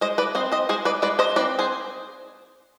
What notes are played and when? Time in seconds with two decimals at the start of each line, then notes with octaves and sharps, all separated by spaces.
0.01 G#3 C5 D#5
0.18 B4 D5
0.35 C4 C5 D#5
0.52 C5 D#5
0.69 G#3 G#4 C5
0.85 B4 D5
1.02 G#3 B4 D5
1.19 C5 D#5
1.36 C4 B4 D5
1.59 G#4 C5